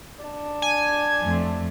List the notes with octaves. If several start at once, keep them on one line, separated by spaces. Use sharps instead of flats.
D4
G#5
F2 A3